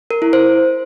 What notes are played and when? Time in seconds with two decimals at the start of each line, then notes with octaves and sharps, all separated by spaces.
0.11 A#4
0.22 E4
0.33 C5